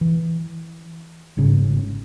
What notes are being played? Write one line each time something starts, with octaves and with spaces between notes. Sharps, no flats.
E3
G1 G#2 C#3